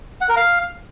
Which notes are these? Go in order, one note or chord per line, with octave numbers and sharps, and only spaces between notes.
F#5
A#4
F5